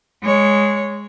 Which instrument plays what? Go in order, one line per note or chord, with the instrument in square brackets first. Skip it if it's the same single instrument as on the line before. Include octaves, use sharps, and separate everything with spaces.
[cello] G#3 C#5